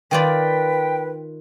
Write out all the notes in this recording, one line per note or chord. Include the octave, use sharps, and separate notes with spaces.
D#3 F4 B4 D5 G5